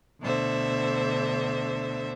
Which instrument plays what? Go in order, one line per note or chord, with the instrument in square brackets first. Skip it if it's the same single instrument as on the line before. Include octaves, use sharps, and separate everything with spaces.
[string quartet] D2 B2 D3 C5 E5